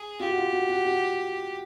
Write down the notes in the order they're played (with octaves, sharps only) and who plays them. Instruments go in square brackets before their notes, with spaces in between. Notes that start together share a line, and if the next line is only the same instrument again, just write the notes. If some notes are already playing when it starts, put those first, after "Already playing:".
Already playing: [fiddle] G#4
[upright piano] F4 [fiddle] G4
[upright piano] F#4
F4
F#4
F#4
F#4